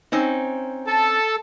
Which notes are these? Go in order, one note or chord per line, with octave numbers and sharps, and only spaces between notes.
C4 C#4 D#4
A4 A5